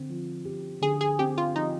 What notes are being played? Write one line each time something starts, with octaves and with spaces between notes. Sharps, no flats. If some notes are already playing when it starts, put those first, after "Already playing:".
Already playing: D3 C4
F3
G4
D3 G#4
G#4
C4 G4
F4
F3 D#4